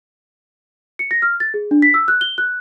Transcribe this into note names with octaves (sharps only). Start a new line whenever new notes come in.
C#7
A#6
F6
A6
G#4
D4
B6
E6
F#6
G7
F#6